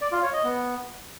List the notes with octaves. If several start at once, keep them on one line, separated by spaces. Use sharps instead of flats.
D5
F4
C#5
D#5
B3